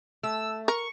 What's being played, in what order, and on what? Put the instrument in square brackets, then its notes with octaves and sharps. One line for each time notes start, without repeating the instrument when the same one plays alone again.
[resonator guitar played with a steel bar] A3 [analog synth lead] E6
[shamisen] A#4 [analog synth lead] C#6